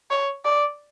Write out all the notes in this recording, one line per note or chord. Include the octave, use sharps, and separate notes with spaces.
C#5
D5